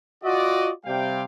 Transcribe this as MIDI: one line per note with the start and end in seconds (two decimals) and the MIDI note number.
0.24 0.70 65
0.24 0.70 66
0.24 0.70 74
0.24 0.70 75
0.85 1.24 48
0.85 1.24 55
0.85 1.24 77
0.85 1.24 79